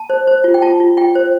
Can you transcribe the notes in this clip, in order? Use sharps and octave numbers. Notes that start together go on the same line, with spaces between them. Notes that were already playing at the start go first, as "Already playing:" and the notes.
Already playing: A5
C5
C5
F4
G5
F4 A5
F4
F4 G5
C5